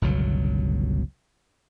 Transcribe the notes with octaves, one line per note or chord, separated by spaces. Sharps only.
G1 C#2 B2 F#3